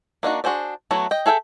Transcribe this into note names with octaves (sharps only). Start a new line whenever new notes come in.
A#3 D4 D#4 F#4
D4 F#4 G#4 C5 D5
F#3 A3 B3 E4 F#4
D#5 G5
G#4 A4 E5 F5 G5